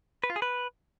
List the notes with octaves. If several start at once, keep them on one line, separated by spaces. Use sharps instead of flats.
B4
F4
G#4
B4